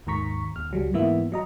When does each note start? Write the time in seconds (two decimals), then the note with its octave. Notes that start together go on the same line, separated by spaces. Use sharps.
0.07 D#2 G#2 D#3 A#5 C#6 B6
0.56 D#2 F6
0.71 C#2 F#3 G3
0.94 G#2 E3 A#3 B3 E4 E5
1.32 F#3 D#5 A#5